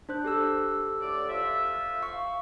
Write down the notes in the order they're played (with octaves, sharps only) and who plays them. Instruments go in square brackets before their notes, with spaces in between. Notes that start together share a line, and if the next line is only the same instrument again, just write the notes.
[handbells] D4 C5 F#6
G4 A4 E6
[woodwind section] D2 A2 D5
F4 C5 E5
[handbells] F5 C#6